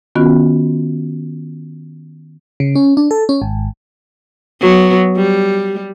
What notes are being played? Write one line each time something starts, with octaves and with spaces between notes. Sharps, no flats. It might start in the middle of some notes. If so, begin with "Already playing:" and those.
D#3 B3 C#4 F4 F#4
C#3
C#4
D4
A4
C#4
G#1
F#3 B3
G3